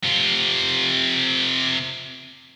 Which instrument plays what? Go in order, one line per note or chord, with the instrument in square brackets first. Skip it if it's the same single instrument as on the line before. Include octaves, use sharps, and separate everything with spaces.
[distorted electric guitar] C3 F4